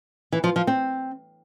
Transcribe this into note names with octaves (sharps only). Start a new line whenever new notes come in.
E3
F3
F3
C4